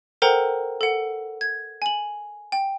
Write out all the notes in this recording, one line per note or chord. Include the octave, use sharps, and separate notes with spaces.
A4 A#4 C5 F#5 G5 A#5
A4 F#5
G#6
G#5 F#7
G5